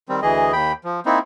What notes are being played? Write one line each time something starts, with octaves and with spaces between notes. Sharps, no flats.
D#3 G3 C4
D2 E3 G#4 D#5
D#2 G5 B5
F3
A#3 C4 D#4 E4